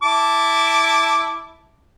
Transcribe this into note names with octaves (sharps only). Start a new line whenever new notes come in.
E4 A5 D6